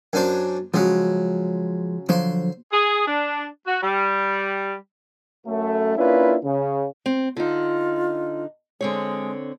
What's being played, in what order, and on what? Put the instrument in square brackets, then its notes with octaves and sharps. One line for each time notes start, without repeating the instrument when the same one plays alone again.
[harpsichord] F#2 D4 C5
[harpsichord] C#3 F#3 [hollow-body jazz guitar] F3 G#3 C#4
[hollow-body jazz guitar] D3 F3 F#3 [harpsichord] C5 C6
[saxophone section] G#4
D4
F#4
G3
[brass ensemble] F#2 A3
A#3 C#4 D4 E4 F4 B4
C#3
[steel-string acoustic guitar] C4
[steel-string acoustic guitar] D3 D#4 [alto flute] F4
[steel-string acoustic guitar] D3 C4 C#5 [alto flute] G#3